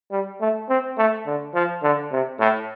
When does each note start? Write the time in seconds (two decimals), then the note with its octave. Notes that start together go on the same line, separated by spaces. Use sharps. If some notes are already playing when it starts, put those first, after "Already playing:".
0.11 G3
0.41 A3
0.69 C4
0.97 A3
1.26 D3
1.54 F3
1.83 D3
2.12 C3
2.39 A2